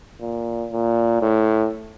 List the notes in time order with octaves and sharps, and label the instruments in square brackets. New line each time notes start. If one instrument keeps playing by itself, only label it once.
[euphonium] A#2
A#2
A2